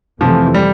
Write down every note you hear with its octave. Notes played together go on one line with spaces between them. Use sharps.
F2 C3 E3 F3 A3 C4
G3